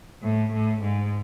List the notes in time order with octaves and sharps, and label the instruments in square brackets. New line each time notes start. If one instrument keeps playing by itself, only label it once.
[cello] A2
A2
G#2